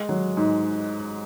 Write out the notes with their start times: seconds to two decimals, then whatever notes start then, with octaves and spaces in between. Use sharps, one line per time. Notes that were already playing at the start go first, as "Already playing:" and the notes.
Already playing: G#3
0.09 F#3
0.37 G#2